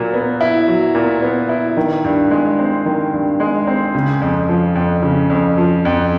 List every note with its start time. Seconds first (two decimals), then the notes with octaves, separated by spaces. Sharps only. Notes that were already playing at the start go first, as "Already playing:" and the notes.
Already playing: A#2 F#3
0.14 B3
0.41 E4
0.68 F#3
0.95 A#2
1.22 B3
1.49 E4
1.77 D#3
2.04 G2
2.31 G#3
2.59 C4
2.86 D#3
3.13 G2
3.40 G#3
3.67 C4
3.95 C#3
4.21 F2
4.49 F3
4.75 F2
5.03 C#3
5.30 F2
5.58 F3
5.85 F2